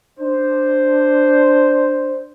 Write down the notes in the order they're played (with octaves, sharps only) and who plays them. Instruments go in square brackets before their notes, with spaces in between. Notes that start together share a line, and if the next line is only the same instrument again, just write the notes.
[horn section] D4 C5